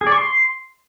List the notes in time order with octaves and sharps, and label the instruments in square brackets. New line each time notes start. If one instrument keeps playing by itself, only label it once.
[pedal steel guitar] G#4
D5
C#6
C6